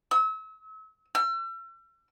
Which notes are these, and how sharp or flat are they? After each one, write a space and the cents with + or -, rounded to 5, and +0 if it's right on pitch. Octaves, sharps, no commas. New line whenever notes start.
E6 -35
E6 +40